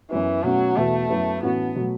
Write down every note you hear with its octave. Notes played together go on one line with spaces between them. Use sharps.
F#2 E3 F#3 B3
B2 F#3 A3 C#4
E2 B2 A3 B3 F#4
F#2 F#3 B3 E4
A2 E3 B3 C#4 F#4
B2 F#3 A3 F#4